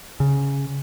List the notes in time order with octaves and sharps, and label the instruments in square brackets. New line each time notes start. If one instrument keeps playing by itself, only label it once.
[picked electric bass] C#3